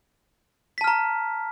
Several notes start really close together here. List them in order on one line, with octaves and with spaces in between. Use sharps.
B6 A5 F6 A#5